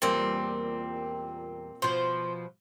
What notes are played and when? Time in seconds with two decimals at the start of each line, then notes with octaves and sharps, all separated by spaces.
0.02 E2 A#2 G3 A#3 C4
1.82 B2 F3 C5